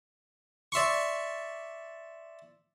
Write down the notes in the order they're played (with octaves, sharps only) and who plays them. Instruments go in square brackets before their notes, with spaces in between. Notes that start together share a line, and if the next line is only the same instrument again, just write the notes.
[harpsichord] D5 E5 C6 C#6